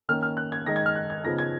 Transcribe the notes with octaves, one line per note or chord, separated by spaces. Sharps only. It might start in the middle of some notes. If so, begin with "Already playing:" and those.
D#3 A#3 C#4 F6
F6
F#6
G#6
D#3 G#3 D#4 A#6
G#6
F6
F#6
G#6
C#3 F3 B3 D#4 A#6
G#6